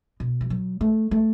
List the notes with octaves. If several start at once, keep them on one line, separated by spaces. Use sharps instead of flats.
B2
E3
F#3
A3
A3